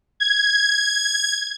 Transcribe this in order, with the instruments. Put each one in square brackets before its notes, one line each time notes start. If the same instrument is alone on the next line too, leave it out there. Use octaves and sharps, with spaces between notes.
[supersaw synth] G#6